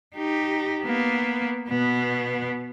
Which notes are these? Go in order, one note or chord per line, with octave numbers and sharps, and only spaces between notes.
D#4 G4
A#3 B3
B2 B3